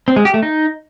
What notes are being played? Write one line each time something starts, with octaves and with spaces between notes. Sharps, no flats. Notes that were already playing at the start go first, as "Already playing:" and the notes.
C4
G#3
G4
A3
D#4